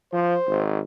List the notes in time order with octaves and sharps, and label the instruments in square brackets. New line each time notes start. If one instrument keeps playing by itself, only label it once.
[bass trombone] F3 [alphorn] C5
[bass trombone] G#1